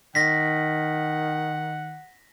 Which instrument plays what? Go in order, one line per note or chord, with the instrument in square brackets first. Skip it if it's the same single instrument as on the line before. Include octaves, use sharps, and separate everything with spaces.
[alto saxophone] D#3 [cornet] F#5 [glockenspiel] A#6 B6